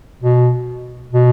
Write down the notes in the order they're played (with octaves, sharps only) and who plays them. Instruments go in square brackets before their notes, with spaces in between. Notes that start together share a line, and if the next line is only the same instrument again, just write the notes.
[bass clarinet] B2
B2